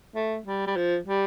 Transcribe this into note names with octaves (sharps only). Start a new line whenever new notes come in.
A3
G3
G3
F3
G3